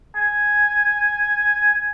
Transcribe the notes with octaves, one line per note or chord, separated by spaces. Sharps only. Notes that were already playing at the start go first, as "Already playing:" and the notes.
G#5